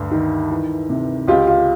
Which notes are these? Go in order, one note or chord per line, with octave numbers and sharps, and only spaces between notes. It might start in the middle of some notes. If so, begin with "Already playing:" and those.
Already playing: D2 G2
D#3
E3
C3
C#2 F4 G4
F4